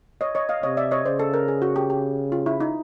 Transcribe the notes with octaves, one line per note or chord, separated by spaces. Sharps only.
C#5 D#5
C#5 D#5
D#5 F5
C3 C#5 D#5
D5 E5
C#5 D#5
C#3 C5 D5
A4
A#4
G#4
F#4
G4
G4
F4
E4
D#4